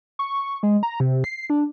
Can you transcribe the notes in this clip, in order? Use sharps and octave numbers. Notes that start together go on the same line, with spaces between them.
C#6
C#6
G#3
A#5
C3
C7
D4